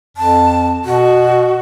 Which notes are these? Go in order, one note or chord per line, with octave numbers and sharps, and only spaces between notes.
F2 A5
B2 F#4